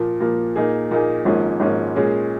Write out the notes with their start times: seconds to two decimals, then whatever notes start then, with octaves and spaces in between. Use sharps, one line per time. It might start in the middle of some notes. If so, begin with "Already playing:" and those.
Already playing: A#2 F3 A#3
0.20 A#2 F3 A#3
0.56 A#2 A#3 D#4 G#4
0.91 A#2 A#3 D#4 G#4
1.25 G#1 G#2 F3 A#3 C#4
1.60 G#1 G#2 F3 A#3 C#4
1.96 A#2 G#3 C#4 G#4